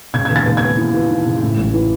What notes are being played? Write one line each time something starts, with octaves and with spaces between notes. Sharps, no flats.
C#3 G#6
D#2 G#6
A6
D#2
B3 G#6
E3
E3
E3
C#3
A2
A1
E3